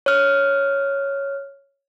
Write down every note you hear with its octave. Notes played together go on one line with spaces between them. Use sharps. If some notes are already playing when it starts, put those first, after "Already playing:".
C#5 F6